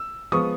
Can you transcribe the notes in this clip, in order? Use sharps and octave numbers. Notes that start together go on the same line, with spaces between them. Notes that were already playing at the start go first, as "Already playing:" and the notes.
Already playing: E6
F3 G#3 B3 C#6 D#6